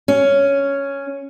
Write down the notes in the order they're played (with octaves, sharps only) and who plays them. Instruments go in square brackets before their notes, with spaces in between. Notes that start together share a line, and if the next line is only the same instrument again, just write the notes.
[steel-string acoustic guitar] C#4